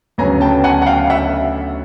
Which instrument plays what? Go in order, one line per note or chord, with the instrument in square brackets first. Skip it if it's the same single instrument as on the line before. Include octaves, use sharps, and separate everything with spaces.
[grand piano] D2 C#3 F#3 B3 G#5 A#5
G5 A5
F#5 G#5
F#5
F5 G5
E5 F#5